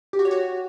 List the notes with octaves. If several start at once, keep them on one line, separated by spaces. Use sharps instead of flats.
G4
F#4
C#5
F#4